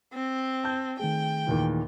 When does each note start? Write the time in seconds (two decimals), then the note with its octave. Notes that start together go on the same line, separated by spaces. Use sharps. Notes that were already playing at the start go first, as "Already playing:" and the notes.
0.13 C4
0.64 A5 G6
1.00 D#3 A3 G#4 G5
1.46 D#2 A#2 E3